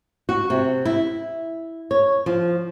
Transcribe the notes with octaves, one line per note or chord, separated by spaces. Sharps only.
F#4
C3
E4
C#5
F3